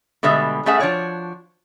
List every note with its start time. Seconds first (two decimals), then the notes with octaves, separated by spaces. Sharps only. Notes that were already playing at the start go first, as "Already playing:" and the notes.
0.23 B2 D3 G3 G#3 E5
0.66 G3 A3 C#4 G#4 E5 F#5
0.79 F3 D4 F#4 C#5 D5